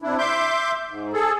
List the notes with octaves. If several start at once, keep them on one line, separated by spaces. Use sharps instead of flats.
C3 D4 E4
E5 C6 D6 G6
G#2
G#4 A4